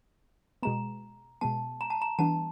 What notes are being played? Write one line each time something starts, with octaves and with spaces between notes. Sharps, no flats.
B2 G#3 B3 A#5
B2 G#3 B3 A5
A#5
A5
A#5
E3 G3 B3 D4 A5